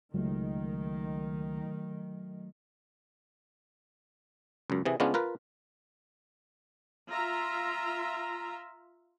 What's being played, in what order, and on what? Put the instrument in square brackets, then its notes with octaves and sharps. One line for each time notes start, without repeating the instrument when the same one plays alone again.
[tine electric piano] C#2 [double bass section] D#3 [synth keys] F#3 A3
[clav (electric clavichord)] C#2 F#2
C3 E3 G#4
C#3 G#3 B3 C#4 D4 F4
F4 A#4 B4
[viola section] F4 E5 A#5